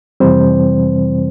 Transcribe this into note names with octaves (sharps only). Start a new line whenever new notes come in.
F2 C3 E3 G3 C4 C5